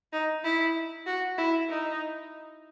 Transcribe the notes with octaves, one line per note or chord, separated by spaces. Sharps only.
D#4
E4
F#4
E4
D#4